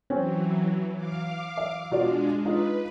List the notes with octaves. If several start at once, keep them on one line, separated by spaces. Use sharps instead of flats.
E3 F#3 C4 C#4
F5 D6
E5
B2 G#3 D4 F4 D5
D#4 F4 B4